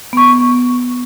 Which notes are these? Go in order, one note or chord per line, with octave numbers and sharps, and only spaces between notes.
B3 C#6